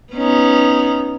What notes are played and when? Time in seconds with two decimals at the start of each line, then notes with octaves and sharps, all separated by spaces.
0.13 B3 C#4 D#4